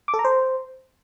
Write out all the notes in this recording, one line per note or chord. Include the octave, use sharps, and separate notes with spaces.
D6
A4
A#5
C5